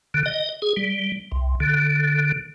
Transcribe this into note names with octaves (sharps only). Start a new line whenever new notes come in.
D3
D#5
G#4
G3
C2
D3